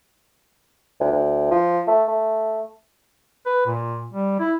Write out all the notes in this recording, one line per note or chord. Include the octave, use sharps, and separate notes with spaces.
D2
D2
F3
A3
A3
B4
A#2
G3
E4